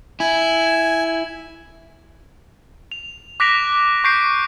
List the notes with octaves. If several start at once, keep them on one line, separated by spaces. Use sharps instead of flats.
E4 G#5
F7
D6 F#6 A#6 B6 D7 F7
C#6 G6 B6 C7 D7